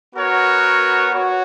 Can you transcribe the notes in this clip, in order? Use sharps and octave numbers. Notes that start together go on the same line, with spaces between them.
B3 F#4 A#4 C#5
F#4 C#5